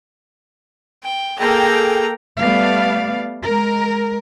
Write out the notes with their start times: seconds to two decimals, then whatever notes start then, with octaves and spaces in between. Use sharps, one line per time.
1.03 G5
1.39 A#3 G#4 A4 G5 A#5
2.38 G3 A3 B3 D5 F5
3.43 G#3 A#4